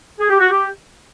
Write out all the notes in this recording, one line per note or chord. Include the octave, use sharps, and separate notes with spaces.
G#4
G4
F#4
G4